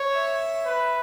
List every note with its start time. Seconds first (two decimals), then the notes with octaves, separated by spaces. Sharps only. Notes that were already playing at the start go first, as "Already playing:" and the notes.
Already playing: C#5
0.12 E5
0.65 B4